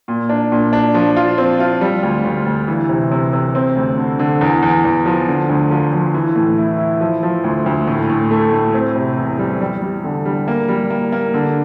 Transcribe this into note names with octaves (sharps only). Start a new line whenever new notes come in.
A#2
D4
A#2
D4
F3
F4
C4
F4
G3
D2
D2
D2
E3
C3
C3
C3
C4
D2
D3
D3
E2
E2
E2
F3
D3
D2
F3
F3
E3
A2
E4
E4
F3
F3
D2
D2
A2
A2
A3
A2
C4
C3
E2
G3
G3
G3
D3
G3
A#3
G3
A#3
A#3
D3